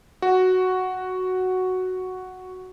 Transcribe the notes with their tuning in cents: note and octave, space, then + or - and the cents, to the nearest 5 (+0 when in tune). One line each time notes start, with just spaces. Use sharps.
F#4 +0